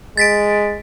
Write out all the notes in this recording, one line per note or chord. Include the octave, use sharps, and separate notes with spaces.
G#3 A6 B6 D7